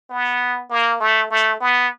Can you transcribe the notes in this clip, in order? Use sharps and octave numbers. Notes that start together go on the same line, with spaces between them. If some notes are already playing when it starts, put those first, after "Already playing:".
B3
A#3
A3
A3
B3